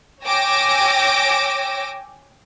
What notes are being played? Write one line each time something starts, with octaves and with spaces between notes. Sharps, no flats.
C#5 G5 G#5 D6 E6 A#6